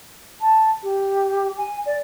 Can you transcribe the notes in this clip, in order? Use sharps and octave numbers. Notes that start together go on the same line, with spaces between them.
A5
G4
G#5
D5